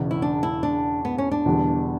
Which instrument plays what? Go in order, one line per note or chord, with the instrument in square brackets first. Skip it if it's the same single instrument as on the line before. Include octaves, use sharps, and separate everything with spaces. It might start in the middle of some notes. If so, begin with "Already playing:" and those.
Already playing: [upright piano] E1 E2 C#3
[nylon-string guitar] E4
D4
E4
D4
B3
C#4
D4
[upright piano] E1 E2 D3 G3 B3